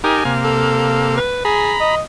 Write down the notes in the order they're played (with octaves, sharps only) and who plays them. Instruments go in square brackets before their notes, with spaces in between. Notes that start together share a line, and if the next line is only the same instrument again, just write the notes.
[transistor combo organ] D#4 G4 A#4 [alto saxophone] G#5
[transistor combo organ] C3 A#3 F5
[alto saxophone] A4
B4
[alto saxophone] G#4 [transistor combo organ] A#5 B5
[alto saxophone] D#5